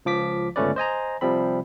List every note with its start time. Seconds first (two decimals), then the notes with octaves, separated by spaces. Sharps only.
0.05 C#2 F3 D6 B6
0.56 G1 C#2 A3 C#4 B4 D5
0.76 C5 D#5 G#5 A#5
1.21 C3 F3 G3 C4 B5